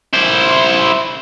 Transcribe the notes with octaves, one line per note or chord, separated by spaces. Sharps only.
E4 C5